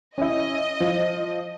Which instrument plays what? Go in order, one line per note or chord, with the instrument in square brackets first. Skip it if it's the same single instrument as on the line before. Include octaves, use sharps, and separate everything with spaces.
[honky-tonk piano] C#4 E4 [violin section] D#5
[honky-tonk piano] F3